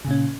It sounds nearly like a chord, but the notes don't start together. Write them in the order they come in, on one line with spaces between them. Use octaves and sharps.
C#3 A#2 C#4